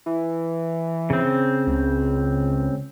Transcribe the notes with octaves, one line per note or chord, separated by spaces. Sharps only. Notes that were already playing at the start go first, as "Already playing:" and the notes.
E3
C#3 C4
C#2